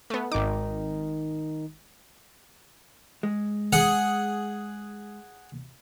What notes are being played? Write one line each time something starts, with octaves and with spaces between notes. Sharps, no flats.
A3 B3
G#1 D#3 D#4 D6
G#3
G#4 F#5